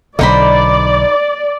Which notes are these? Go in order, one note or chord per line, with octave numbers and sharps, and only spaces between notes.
B1 D3 D#4 C5 D5 B5